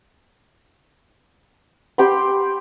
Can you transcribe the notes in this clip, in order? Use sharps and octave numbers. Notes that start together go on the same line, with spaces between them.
G4 G5 B5 C6